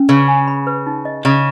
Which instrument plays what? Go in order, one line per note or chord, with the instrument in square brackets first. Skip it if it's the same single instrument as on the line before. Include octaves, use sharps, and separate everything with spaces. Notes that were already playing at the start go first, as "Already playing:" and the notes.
Already playing: [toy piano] C#4
[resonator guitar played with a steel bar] C#3 [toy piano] B4
[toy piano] G#5
B5
B4
D#4
D#5
[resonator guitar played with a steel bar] C#3 [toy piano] D#5